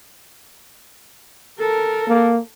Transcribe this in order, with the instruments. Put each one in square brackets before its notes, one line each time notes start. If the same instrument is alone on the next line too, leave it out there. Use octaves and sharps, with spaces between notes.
[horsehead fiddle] A4 A#4
[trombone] A#3